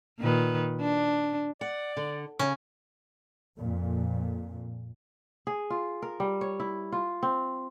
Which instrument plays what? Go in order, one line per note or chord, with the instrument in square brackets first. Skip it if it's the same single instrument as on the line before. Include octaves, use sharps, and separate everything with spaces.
[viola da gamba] A#2 D#3 B4
D4
[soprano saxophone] D5 [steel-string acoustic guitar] F#5
[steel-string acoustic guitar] D3
[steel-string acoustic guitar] C#3 [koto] C#4
[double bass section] F2 A#2
[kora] G#4
F4
A#4
G3
C#5
E4
F4
C4